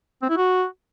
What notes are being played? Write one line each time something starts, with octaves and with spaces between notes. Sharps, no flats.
C4
E4
F#4